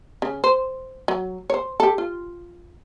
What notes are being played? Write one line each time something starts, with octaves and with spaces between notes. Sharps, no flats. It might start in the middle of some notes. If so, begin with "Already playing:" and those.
C#3
C5
F#3
C5 C#5
G4 A4
F4